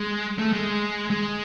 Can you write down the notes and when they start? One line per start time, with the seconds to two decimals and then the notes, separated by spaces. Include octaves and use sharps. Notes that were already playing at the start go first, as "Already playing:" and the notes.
Already playing: G#3
0.38 A3
0.53 G#3
1.10 G#3